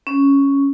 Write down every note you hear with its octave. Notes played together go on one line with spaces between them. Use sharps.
C#4